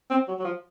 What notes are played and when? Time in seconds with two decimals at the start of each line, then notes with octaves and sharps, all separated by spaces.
0.11 C4
0.28 F#3
0.39 F#3
0.44 F3